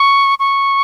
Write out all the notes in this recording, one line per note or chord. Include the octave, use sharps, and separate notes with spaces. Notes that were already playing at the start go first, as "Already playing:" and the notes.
Already playing: C#6
C#6